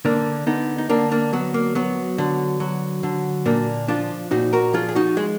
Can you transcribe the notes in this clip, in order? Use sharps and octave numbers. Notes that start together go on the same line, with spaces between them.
D3 A#3 D4
D3 B3 D#4
D#4
D3 A#3 D4
A#3 D4
F#3 B3
A#3
F#3 B3
D3
F#3
D3
A#2 A#3 D4
F3 D4 F4
A#2 D#4 F#4
F#4 A#4
F3 F4 G#4
G#4
D#4 F#4
G#3 G#4